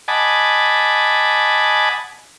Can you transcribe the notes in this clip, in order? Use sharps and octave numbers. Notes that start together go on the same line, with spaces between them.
D#5 F#5 G#5 A5 B5 D6